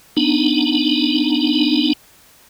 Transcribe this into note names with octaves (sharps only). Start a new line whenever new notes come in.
B3 D4 D#4